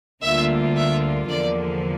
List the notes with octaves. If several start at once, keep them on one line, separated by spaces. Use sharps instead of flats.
D2 D3 G3 A#3 F4 E5
E5
E2 D3 F3 A#3 D5